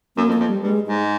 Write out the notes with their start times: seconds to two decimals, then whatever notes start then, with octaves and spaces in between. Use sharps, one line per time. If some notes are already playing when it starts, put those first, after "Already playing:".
0.17 F#2 A#3
0.29 F2
0.32 A#3
0.41 F2
0.48 G3
0.63 G2 G#3
0.86 G#2 G#3